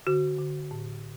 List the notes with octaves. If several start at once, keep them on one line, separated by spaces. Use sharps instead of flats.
D3 F#4
D3
A2